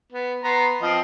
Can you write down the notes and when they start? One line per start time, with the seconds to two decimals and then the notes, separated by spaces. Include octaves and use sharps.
0.12 B3
0.44 B3 A#5 C6
0.82 F3 C4 D#5